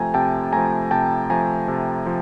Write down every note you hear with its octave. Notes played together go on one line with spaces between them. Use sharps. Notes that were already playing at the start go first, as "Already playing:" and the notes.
Already playing: C3 F3 A3 G5 G#5 A#5
C3 G5 A5
F3 A3 G#5 A#5
C3 G5 A5
F3 A3 G#5 A#5
C3
F3